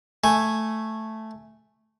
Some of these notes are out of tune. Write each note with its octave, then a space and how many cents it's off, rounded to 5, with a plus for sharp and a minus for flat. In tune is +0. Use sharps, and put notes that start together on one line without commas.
A3 +0 G#5 +0